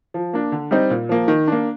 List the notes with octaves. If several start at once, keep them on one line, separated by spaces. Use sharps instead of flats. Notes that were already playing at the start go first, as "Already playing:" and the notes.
F3
A#3 D4
D3
G3 C4 D#4
A#2
F3 A#3
D#3
A#3 D4